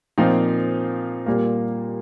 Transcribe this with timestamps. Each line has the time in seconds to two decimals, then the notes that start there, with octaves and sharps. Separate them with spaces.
0.18 A#2 F3 C4 D#4
1.26 A#2 G3 A#3